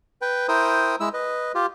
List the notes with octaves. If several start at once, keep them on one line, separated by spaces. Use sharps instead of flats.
B4 G5
E4 A#4 C5 G5 D#6
G#3 E4 E6
B4 D#5
F4 G4